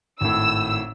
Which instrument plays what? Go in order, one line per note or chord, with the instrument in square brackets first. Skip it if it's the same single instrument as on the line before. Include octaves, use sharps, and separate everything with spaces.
[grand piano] G#1 A2 [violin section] E6